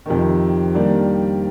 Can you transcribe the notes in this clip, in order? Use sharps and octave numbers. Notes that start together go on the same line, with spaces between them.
F2 C3 D#3
D#3 G3 A#3 D4